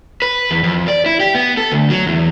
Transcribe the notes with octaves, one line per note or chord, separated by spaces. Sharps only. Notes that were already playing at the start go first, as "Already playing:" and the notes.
B4
E2
F2
D5
E4
G4
B3
A4
D2
F#3
E2